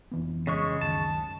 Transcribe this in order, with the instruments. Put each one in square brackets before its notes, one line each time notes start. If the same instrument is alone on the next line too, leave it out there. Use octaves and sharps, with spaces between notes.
[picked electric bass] F1 E3 B3
[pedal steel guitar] C#3 G#3 C#6
[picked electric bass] C#2 F#2 D#3 [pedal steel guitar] A5